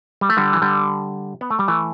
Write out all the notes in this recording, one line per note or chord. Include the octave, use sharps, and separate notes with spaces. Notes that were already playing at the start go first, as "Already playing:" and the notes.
G3
A3
D3 G3
E3
D3 G3
B3
A3
G3
E3 A3